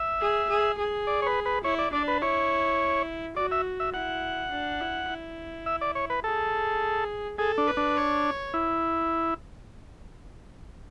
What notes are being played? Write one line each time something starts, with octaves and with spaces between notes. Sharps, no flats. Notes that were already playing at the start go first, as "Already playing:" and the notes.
Already playing: E5
G#4
G#4
G#4
D5
C#5
B4
B4
E4 C#5
D5
D4 D5
B4
E4 C#5
F#4 D5
E5
E5
E4 F#5
D4
E4
E4
E5
D5
C#5
B4
G#4 A4
G#4 A4
D4
B4
D4
C#5
E4